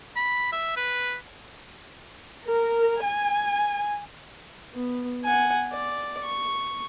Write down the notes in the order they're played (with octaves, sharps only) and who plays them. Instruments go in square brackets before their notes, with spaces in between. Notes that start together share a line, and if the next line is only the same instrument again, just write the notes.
[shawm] B5
E5
B4
[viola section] A#4
G#5
[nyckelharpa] B3
F#5 G#5
D5
C#6